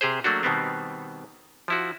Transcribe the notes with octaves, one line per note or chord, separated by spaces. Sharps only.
C3 G4 G#4 C5
F#3 A3 A#3 D4 F#4
B2 D#3 G3 B3 C4
F3 E4 F#4